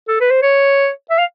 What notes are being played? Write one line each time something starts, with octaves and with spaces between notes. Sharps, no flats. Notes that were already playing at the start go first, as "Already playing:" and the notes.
A4
B4
C5
C#5
E5
F5